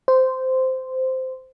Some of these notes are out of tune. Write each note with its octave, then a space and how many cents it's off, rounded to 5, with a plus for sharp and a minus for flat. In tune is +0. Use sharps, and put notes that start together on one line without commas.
C5 -10